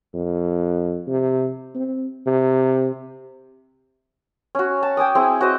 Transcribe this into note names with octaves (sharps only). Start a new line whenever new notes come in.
F2
C3
C4
C3
C#4 F#4
A5
G5 G#5 D6 D#6
C4 E4 G#4
F#4 C5 D#5